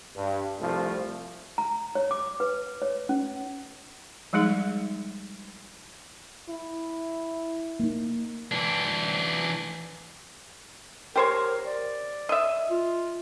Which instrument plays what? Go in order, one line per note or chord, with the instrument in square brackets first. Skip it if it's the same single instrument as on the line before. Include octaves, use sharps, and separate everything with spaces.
[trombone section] G2
C2 F3 A3
[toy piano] A#5
C#5
D6
B4
C#5
C#4
[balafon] F3 G3 G#3 D#4 G#4
[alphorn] E4
[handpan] A#3 D#4
[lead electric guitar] E3 D4
[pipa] G4 C5 C#5 [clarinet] A#4
[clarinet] D5
[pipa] D#5 E5
[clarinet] F4